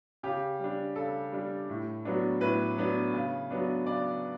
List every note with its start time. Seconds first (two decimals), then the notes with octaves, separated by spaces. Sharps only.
0.23 C#3 G4
0.60 G3 D4
0.96 C#3 A4
1.32 G3 D4
1.69 A2
2.05 F#3 B3 D4
2.41 A2 B4
2.78 F#3 B3 D4
3.14 C#3
3.50 F#3 B3 D4
3.86 C#3 D5